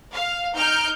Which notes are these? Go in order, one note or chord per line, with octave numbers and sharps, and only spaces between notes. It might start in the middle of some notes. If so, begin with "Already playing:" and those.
F5
D#4 F6 G6 D7